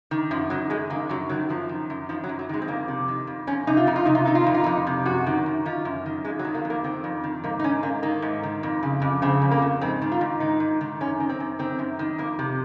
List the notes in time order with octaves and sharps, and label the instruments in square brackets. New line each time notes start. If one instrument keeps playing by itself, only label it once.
[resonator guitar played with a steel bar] D#3
F#2 F3
D#3 F#3
F#2 G#3
D#3 A#3
F#2 F#3
D#3 F#3
F#2 F3
D#3
F#2
D#3 F3
F#3
F#2
F#3
D#3 G#3
C4
F2 A#3
C3
D#3
F2
F2 C#4
C3 D#4
F4
F2 D#4
F4
C3 D#4
F4
D#3 D#4
F4
F2 D#4
F4
F2 D#4
C3
F#2 F#4
D#3
F#2
D#3 F4
F#2
D#3
F2 G#3
F#3
D#3
A#3
F2
A#3
D#3 C4
F2
D#3
G#2 A#3
D#4
D#3 C#4
G#2 A#3
D#3 A#3
G#2
D#3
F2
C#3
F2
C#3 C4
F2
A#3
C#3
G#2 C4
D#3
F4
G#2
D#3 D#4
G#2
D#3
F#2 C#4
D#3
C4
F#2
D#3 C4
F#2
D#3
F2 A#3
C3